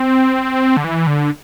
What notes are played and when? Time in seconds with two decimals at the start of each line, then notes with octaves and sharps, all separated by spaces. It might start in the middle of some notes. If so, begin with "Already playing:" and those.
Already playing: C4
0.77 D3
0.84 E3
1.07 D3